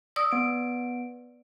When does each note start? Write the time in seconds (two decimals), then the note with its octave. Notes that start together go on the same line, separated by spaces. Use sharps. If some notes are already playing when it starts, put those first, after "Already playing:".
0.16 D5 D#6 E6
0.32 B3 D7